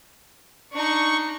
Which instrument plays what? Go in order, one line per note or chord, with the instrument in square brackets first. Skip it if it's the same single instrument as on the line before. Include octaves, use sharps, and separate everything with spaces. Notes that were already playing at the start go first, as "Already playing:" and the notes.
[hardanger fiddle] D4 D#4 [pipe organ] C#6